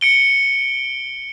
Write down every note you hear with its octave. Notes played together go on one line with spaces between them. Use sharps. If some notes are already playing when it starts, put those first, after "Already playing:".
C#7 D7 G7